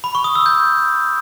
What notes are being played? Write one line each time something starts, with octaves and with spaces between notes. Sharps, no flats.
B5
C#6
D#6
E6
G6